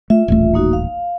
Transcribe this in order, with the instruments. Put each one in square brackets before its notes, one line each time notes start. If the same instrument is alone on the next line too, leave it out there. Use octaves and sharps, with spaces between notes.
[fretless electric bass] A3 [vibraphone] F4 E5
[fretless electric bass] D#1 A1 A3
[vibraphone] A#3 D#4 F#4
F5